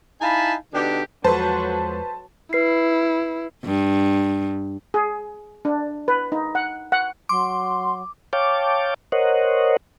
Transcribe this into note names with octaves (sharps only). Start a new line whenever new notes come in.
D#4 E4 F5 G#5 A5 B5
B2 D3 D4 D#4 G4
E2 F3 F#3 G#3 A4 B4 C5 A5
E4 B4 C7
G2
G#4
D4
B4
D#4
F#5
F#5
F#3 C6 D6
C#5 F5 G5 A5 D6
A#4 C5 C#5 D#5 F#5